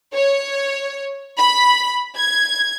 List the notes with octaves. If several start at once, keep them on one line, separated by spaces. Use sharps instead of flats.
C#5
B5
G#6